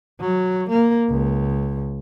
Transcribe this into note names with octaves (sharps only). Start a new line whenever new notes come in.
F#3
A#3
C#2